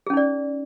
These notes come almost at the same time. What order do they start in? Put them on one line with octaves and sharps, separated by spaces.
G#4 C#4 D#4 D5